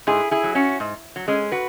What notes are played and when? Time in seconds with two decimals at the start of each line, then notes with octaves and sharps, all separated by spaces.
0.07 G#2 E4 G#4
0.31 E4 G#4
0.44 F#3
0.55 C#4 F#4
0.80 G#2
1.16 F#3
1.28 G#3 C#4
1.52 F#4 B4